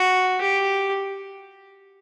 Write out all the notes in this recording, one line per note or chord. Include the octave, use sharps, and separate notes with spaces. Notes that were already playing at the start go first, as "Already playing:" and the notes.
Already playing: F#4
G4